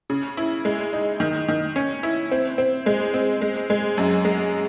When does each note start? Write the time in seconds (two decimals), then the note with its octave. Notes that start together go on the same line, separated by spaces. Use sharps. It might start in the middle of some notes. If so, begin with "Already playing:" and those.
0.10 C#3
0.37 E4
0.65 G#3
0.93 D#4
1.20 D#3
1.48 D#3
1.76 C#4
2.03 E4
2.31 C4
2.58 C4
2.86 G#3
3.14 C4
3.41 G#3
3.70 G#3
3.98 F#2
4.25 G#3